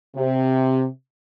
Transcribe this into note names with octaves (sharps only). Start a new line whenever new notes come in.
C3